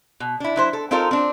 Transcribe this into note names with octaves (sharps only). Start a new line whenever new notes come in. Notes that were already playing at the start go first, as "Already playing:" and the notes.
B2
D4 E4
F#3 E4 C5
A4
C4 D#4 F4 A4 A#4
C4 D4